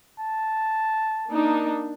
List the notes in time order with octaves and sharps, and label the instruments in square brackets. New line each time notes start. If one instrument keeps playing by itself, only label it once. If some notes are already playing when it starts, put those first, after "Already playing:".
[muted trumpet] A5
[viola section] A#3 D4 D#4